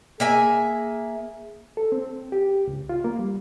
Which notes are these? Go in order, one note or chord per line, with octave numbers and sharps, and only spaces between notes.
A#3 G#4 E5 G#5
A4
C4
G4
C#2
F4
A#3
G3